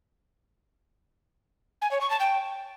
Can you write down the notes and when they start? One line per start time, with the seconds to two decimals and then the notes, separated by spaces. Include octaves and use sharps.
1.82 G#5
1.91 C#5
2.01 C#6
2.10 A5
2.20 G5